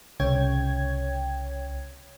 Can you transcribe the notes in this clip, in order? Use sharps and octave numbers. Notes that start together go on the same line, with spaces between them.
C2 C#3 C#5 G5 G#6